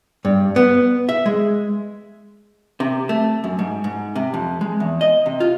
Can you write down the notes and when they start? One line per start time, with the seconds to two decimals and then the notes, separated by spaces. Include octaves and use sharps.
0.25 G2
0.56 B3
1.09 E5
1.26 G#3
2.80 C3
3.09 A3
3.44 F#2
3.59 G#2
3.84 G#2
4.15 C3
4.34 F2
4.61 G#3
4.80 E2
5.01 D#5
5.26 C3
5.40 F4